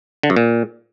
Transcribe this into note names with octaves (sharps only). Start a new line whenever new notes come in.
D3
F#2
A#2